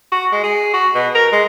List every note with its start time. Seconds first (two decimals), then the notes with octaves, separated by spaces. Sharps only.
0.12 F#4
0.32 G#3
0.44 G#4
0.74 F#4
0.95 B2
1.15 A#4
1.32 G#3